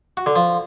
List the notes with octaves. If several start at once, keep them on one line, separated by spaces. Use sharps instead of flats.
F#4
D3
F3